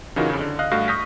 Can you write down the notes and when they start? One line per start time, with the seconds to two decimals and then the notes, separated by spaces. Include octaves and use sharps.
0.16 C#3 E3 D#4 F4 F#4 A#4
0.29 F2 C#3
0.41 D3
0.59 D#5 F5 F#6
0.71 G2 A3 F#4 F5 A#6
0.88 C#6 D#6 F6 G6 A#6 B6